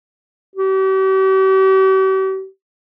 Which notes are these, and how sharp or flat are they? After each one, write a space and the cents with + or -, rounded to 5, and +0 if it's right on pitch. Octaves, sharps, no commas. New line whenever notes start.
G4 -45